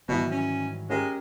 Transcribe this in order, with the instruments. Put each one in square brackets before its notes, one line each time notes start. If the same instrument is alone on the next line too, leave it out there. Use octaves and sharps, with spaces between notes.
[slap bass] G#2 D#3 G3 [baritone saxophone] B2 [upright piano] E3 F#3
[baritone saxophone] C#4
[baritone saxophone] G#3 [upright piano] C#4 G4 A#4